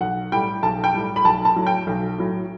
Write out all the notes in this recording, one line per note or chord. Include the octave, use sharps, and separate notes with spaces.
B1 F#5
A2 G3 G5
B1 A5
G5
A2 G3
B5
B1 A5
A5
A2 F#3
G5
B1
A2 F#3